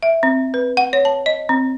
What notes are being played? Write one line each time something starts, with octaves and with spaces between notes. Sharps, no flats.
E5
C4
B4
F#5
C#5
A5
D#5
C4